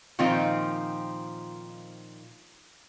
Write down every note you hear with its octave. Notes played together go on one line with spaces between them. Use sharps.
A#2 D#3 F3 C4 D#4 F4